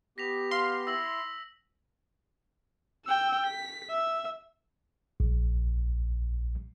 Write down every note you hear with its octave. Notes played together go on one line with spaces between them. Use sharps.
B3 G4 A#6 B6 F7
F5 C6
E4 E6 A#6 F#7
G5 E6
B6
E5
A#1